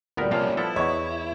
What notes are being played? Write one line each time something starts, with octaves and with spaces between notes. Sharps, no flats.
D2 A#2 G3 B3 A#4
C3 F3 A#3 C#4 F5
F3 B3 E4 A4
E2 B3 C#5 D#5 C#6